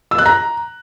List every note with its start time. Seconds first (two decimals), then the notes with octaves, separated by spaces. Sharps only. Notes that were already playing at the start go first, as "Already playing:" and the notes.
0.11 E6
0.18 F#6
0.26 A#5